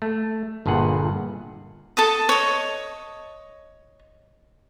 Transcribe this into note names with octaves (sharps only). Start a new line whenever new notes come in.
A3
G1 G2 A#2 G#4 F#5
A4 A5 D#6
C#5 D#5